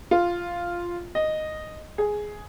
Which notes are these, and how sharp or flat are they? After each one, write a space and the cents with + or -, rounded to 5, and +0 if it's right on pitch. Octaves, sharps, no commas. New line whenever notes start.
F4 -5
D#5 -5
G#4 +5